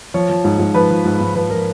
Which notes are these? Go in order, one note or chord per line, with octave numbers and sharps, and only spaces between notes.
F3 C#5
F3
G#2
G#2
F3 B4
F3
G#2
G#2
F3 B4
F3 A#4